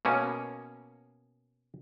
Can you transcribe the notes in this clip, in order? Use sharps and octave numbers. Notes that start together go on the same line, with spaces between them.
B2 A#3 C#4